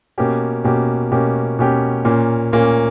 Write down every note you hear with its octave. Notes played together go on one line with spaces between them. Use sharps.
B2 A#3 C#4 G4
B2 A#3 C#4 G4
B2 A#3 C#4 G4
B2 A#3 C#4 G4
A#2 A#3 C#4
A#2 A#3 C#4